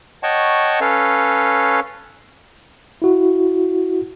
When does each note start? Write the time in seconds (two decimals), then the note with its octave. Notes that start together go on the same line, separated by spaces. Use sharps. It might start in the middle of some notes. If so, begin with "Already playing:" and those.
0.23 C#5 D#5 F#5 G5 A5 C#6
0.81 C#4 A4 B4 C#5 F5
3.02 E4 F#4